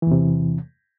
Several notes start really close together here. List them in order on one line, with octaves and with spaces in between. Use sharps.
E3 E2 C3